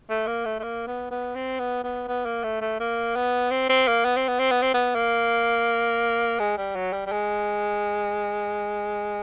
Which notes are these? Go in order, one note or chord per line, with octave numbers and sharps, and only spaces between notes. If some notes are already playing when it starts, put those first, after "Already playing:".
A3
A#3
A3
A3
A#3
B3
B3
C4
B3
B3
B3
A#3
A3
A3
A#3
B3
C4
C4
A#3
B3
C4
B3
C4
B3
C4
B3
A#3
G#3
G3
F#3
G3
G3
G#3